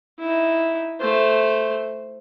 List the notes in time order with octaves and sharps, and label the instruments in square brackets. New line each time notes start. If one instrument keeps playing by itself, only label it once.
[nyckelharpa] D#4 E4
A3 C5